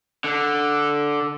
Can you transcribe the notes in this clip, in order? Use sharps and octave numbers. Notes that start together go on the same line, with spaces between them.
D3